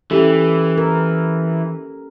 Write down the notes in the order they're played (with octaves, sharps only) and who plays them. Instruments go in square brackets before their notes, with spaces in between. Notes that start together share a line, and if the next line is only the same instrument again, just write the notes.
[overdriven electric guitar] E3 [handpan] C#4 G4 A4
[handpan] A#4